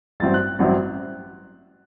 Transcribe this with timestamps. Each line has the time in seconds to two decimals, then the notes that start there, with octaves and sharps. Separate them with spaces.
0.20 A1 G2 F#3 C4 E4 A6
0.34 F#6
0.59 A1 G2 F#3 C4 E4